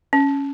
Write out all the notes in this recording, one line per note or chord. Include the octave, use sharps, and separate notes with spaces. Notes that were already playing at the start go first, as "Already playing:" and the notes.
C#4